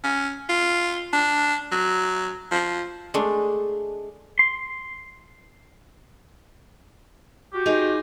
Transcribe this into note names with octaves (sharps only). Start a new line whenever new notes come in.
C#4
F4
D4
F#3
F3
G#3 A3 D4
C6
F#4 G4
D#4 F4 G#4